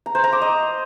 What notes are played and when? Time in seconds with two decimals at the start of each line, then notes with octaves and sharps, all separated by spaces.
0.06 A#5
0.15 C5
0.24 A#5
0.33 D6
0.42 D#5